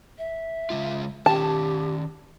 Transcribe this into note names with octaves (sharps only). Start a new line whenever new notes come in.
E5
C#3 G#3 F4
D#3 C#4 G4 A5